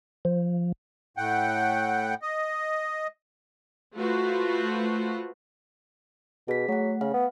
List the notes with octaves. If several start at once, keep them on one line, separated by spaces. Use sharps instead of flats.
F3
A2 F#5 G5
D#5
A3 F4 F#4 B4 C5
B2 G#4 B6
F#3 A3 F#5
C#3 F5
B3